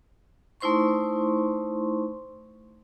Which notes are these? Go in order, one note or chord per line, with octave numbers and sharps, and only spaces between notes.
A3 D#4 E4 C5 C6 C#6